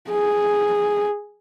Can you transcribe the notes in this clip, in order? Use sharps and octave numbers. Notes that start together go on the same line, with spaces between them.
G#4